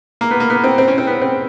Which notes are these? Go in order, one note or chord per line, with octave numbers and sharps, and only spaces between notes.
A#3
B3
A#3
B3
C4
C4
C#4
C4
B3
C4